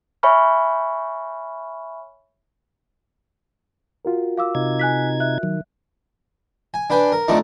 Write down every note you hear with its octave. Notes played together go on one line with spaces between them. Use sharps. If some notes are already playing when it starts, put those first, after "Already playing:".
C#5 E5 G#5 B5 C#6 F6
F4 F#4 A#4
F5 D6 E6
C3 D#4 G#6
G#5 F#6 B6
E5 F#6
D#3 F#3
G#5
D4 B4 G5 G#5
A#4
F2 D3 A3 D#4 D5